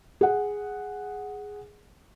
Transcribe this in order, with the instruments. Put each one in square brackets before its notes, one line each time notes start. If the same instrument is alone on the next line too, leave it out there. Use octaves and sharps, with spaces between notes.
[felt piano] G#4 F#5